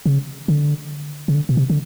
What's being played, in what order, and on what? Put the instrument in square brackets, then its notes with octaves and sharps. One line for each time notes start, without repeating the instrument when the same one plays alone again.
[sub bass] C#3
D3
C#3
D3
B2
C3
D3